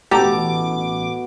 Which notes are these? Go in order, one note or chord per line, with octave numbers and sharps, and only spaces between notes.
A1 B2 G4 A4 A#5 D6